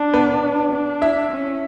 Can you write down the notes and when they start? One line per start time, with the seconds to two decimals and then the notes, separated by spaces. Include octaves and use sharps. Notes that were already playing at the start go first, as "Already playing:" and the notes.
Already playing: D4
0.14 B3 B4
0.72 D4
1.01 E4 E5
1.32 C#4